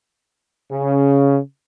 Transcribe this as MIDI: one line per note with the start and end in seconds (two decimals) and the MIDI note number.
0.71 1.38 49